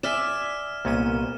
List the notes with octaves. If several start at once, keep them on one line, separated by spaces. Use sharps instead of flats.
D5 E5 G#5 F6 E7
C2 A#2 A#3 B3 C#4 D#7